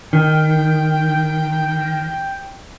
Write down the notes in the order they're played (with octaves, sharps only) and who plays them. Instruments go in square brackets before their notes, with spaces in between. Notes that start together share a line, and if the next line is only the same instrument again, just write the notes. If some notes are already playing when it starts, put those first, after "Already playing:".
[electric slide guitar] D#3 [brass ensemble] G5